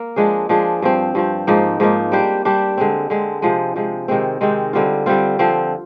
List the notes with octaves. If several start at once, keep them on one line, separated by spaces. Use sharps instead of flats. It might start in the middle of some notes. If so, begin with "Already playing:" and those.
Already playing: A#3 A#4
F3 G#3 D4 G#4
F3 G#3 D4 G#4
G2 F3 C4
G2 F3 C4
G#2 F3 A#3 D#4
G#2 F3 A#3 D#4
G3 D4 G4 C5
G3 D4 G4 C5
D3 G#3 C4
D3 G#3 C4
C3 F3 G#3
C3 F3 G#3
C3 D#3 G#3 C4
C3 D#3 G#3 C4
D3 G3 C4 F4
D3 G3 C4 F4
D3 F3 C4